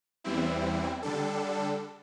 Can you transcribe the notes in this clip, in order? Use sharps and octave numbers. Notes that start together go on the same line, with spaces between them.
E2 E3 G3 C4 E4
D3 G3 D4 A4